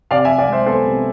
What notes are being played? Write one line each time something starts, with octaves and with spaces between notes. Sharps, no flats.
C3 D5 F5
E5 G#5
C3
D5 F5
G#3 C5 E5
B3 A4 C5
C3